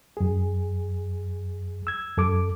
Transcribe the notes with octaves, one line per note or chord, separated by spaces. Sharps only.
F#2 G#4
E6 G#6
F#2 A4 D6